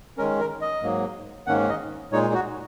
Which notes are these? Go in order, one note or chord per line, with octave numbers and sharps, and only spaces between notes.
D#3 G#3 C#4 A#4
A#4
D#5
G#2 F#3 A#3
G#2 D#3 A#3 C#4 F#5
D#5
A#2 G#3 D#4 C#5
F#4